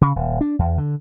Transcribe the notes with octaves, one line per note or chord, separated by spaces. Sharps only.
C#3
D#1
D4
E2
D3